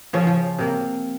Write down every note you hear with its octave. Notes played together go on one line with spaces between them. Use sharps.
C#3 F3 C#4
F3
C3 A#3